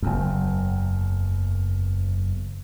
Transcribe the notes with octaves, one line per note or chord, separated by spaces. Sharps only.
F#1 E2